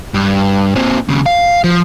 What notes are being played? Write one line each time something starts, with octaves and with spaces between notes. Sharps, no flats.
G2
A#2 C4
D#2 C#3
F5
F3